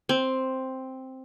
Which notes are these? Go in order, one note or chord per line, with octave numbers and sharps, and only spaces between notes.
C4